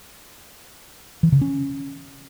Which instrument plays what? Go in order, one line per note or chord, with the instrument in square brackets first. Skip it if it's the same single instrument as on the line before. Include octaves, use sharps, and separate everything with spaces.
[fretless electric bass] E3
C#3
C#4